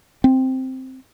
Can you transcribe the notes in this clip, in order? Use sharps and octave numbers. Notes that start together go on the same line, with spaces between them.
C4